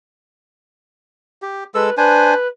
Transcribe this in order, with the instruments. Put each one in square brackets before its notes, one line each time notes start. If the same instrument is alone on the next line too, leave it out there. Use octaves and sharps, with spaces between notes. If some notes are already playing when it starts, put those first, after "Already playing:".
[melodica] G4
[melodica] G#3 A4 E6 [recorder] B4
[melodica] D4 C5 G#5 [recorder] B4